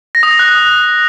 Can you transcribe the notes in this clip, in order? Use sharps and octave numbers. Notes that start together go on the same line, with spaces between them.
A#6
D#6
A#6
F#6